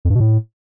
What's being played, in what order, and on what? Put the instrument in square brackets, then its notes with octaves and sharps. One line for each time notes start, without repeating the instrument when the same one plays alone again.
[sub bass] F2
G2
B2
A2